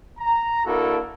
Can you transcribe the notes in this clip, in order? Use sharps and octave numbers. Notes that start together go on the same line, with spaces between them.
A#5
A#3 D4 E4 F#4 A4 A#4